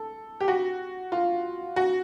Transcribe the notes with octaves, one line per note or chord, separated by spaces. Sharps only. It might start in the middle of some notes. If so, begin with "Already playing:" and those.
Already playing: A4
G4
F#4
F4
F#4